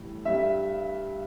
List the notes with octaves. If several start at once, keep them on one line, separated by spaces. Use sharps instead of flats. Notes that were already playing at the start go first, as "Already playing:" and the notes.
Already playing: A2 E3 G3
G2 G3 E5